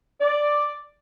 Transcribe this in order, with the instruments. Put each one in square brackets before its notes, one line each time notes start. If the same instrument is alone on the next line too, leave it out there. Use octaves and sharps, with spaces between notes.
[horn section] D5